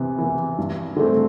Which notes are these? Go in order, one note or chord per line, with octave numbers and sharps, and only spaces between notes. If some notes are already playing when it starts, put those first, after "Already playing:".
Already playing: C3 E3 B3
E3 B3
G2
D3 A3 C4